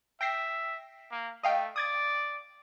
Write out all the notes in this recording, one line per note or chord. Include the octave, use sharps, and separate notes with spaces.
E5 G5 A#6 C7
A#3
A3 D#5 F5 G5
D5 D#6 G#6 A6